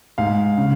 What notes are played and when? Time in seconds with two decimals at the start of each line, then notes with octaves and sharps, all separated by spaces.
0.18 G#2 F5
0.58 C#3